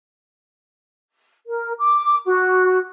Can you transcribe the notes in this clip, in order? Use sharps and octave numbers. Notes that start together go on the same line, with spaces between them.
A#4
D6
F#4